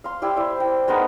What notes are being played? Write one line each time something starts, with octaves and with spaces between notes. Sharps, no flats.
F5 C6
E4 G4 D5
E4 C5 D5
G5
G#3 B3 D#4 A#4